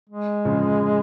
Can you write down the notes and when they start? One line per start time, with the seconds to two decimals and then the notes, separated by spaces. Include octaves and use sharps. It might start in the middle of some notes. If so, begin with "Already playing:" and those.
0.10 G#3
0.45 C#3 F3